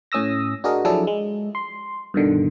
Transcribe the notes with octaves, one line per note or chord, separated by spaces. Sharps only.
A2 C#4 D#6 E6 A#6
D4 F#4 G#4 A#4 D#5
F3 F#3 D4 E4 G#4 A4
G#3
C6
G2 B2 D3 D#3